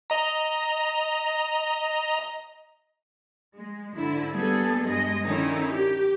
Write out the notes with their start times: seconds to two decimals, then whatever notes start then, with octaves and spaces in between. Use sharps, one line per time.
0.10 D#5 A#5
3.56 G#3
3.95 G#2 D3 E4
4.32 G3 A#3 B3 G#4 A4
4.84 G2 G#3 D#5
5.24 D3 D#3 C#4 D#4 E4
5.71 G4